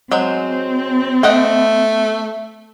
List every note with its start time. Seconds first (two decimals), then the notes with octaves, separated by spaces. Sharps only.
0.11 F#3 G#3 C4 C5
1.23 A3 D#5 F#5 G5